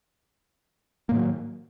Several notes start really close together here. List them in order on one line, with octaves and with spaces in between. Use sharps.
A#3 A2 D#3 F#3